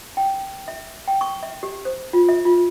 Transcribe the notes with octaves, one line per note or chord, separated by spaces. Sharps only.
G5
E5
G5
C#6
E5
G4
C5
F4
E5
F4